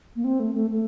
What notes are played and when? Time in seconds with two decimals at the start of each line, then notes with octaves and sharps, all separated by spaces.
0.16 A#3
0.24 C4
0.40 A3
0.55 A3
0.71 A3